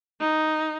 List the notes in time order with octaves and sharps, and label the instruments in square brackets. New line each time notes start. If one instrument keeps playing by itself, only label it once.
[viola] D#4